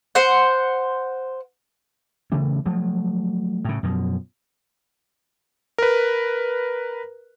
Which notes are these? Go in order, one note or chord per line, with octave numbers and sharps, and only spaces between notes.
C5 F#5
C#3 E3 A3 C#4
F3 F#3 A3
A2 C#3
F#2 B2 F3
A#4 B4